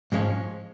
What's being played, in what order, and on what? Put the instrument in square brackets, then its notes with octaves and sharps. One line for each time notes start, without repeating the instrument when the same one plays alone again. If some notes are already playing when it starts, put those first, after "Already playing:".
[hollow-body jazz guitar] G#2 F3 G#3 C#4